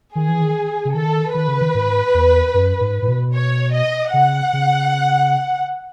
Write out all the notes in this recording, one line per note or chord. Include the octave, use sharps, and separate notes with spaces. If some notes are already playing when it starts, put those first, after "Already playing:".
D#3 G#4
E3
D#3
C#3
D#3 A4
D#3 B4
C#3
D#3
G#2
E2
F#2
G#2
A2
B2
C#5
D#5
C#3 F#5
C#3